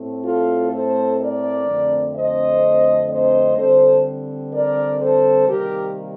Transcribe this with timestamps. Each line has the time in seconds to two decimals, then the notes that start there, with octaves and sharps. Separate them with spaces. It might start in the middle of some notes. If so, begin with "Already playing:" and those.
Already playing: A2 A3 C4
0.24 F4 A4
0.71 A4 C5
1.19 A#4 D5
1.67 F2 D3 A3 C4
2.15 C5 D#5
3.09 C5 D#5
3.57 D3 G3 C4 A4 C5
4.53 A#4 D5
5.00 A4 C5
5.48 C3 D#3 G3 A#3 G4 A#4